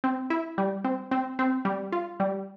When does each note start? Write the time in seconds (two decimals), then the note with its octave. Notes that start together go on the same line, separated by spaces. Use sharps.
0.04 C4
0.30 E4
0.58 G3
0.84 C4
1.11 C4
1.39 C4
1.65 G3
1.92 F4
2.20 G3